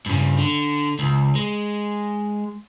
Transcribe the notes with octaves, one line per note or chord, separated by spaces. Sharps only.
G2 C#3
D3
C#2
G#3